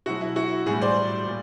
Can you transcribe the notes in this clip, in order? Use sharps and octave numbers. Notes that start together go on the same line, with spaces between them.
B2 F#3 E4 F#4
E4
E4 F#4
A2 E3 G3 F#4 G#4
C5 D5
A#2